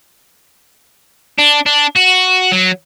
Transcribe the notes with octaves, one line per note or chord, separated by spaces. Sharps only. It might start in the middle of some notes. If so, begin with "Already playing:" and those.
D4
D4
F#4
F#3